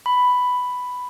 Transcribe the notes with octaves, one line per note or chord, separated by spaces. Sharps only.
B5